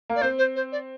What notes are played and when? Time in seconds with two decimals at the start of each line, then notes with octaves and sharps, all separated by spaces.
0.10 A#3
0.16 D5
0.22 C4 C5
0.38 C5
0.56 C5
0.72 D5